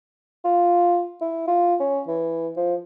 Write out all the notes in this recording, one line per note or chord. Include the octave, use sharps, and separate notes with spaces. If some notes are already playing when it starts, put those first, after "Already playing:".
F4
E4
F4
C#4
E3
F3